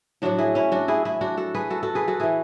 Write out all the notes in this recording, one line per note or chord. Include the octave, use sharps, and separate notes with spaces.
A2 F#3 D4 F#4
E4 G#4
C#4 E4
D4 F#4
E4 G#4
E4 G#4
D4 F#4
F#4 A4
G#4 B4
F#4 A4
F#4 A4
G#4 B4
F#4 A4
E3 E4 G#4